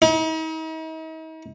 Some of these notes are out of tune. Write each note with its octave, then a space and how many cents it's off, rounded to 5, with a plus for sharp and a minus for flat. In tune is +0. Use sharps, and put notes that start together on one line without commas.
D#4 +45